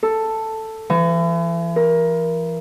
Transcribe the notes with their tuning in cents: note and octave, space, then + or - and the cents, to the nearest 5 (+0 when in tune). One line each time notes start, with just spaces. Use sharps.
A4 +5
E3 +40
A#4 +20